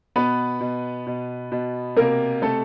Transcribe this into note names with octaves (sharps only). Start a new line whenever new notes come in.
B2 B3 B4
B2
B2
B2
C3 A#3 A#4
C3 A3 A4